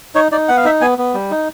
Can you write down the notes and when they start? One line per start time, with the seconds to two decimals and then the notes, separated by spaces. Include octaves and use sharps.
0.15 D#4 C#5
0.32 D#4 D5
0.49 B3 F#5
0.57 F5
0.65 D#4 E5
0.81 B3 G#5
0.98 B3
1.14 G3
1.31 D#4